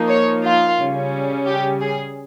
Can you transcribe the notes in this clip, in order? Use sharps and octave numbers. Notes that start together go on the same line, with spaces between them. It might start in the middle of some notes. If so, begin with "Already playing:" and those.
Already playing: F3 A#3 D#4
C#5
F4
C#3 G3 C#4
G4
G#4